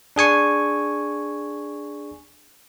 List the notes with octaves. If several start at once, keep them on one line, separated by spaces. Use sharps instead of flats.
D4 G#4 G#5 C#6